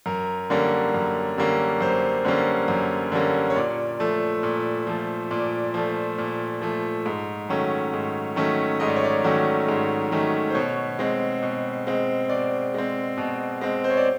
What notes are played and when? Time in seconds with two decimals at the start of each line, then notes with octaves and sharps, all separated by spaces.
0.06 F#2 A#4
0.50 D3 G3 A#3 C#4
0.94 F#2
1.38 D3 G3 A#3 C#4
1.81 F#2 C5
2.25 D3 G3 A#3 C#4
2.68 F#2
3.12 D3 G3 A#3 C#4
3.50 C#5
3.55 A#2 D5
4.00 F3 A3
4.43 A#2
4.87 F3 A3
5.31 A#2 D5
5.74 F3 A3
6.18 A#2
6.62 F3 A3
7.06 G#2
7.49 D#3 F#3 A3 C#4
7.94 G#2
8.36 D#3 F#3 A3 C#4
8.80 G#2 D#5
8.88 D5
8.96 C#5
9.04 D5
9.24 D#3 F#3 A3 C#4
9.68 G#2
10.12 D#3 F#3 A3 C#4
10.50 C5
10.55 B2 C#5
10.99 G#3 C4
11.43 B2
11.87 G#3 C4
12.29 B2 D5
12.74 G#3 C4
13.17 B2
13.61 G#3 C4
13.84 C5
13.90 C#5
13.97 D5